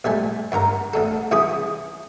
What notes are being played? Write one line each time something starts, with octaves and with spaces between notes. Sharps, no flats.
A#1 G3 A3 G#5
G2 D3 A#4 A#5
D2 D3 A4
C2 E3 C#4 E4 G#4 D#6